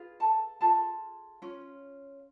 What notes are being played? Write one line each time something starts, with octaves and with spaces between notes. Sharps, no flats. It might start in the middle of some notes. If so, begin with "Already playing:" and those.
Already playing: F4 G#4 B4
A4 A5
F4 G#4 A4 A5
C#4 F4